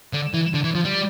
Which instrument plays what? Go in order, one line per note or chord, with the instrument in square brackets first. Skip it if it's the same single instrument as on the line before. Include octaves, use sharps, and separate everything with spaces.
[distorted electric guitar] D3
E3
D3
E3
F3
G3